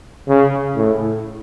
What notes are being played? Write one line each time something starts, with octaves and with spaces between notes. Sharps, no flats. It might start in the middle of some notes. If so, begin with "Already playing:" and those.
C#3
A2